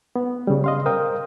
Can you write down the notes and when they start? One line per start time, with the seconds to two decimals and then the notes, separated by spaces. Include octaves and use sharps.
0.16 B3
0.47 C#3 G3
0.64 D#5 F5 C6
0.86 A#4 C5 F5 G5 D#6